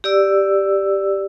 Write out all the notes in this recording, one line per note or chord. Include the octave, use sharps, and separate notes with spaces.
G4 D5 E6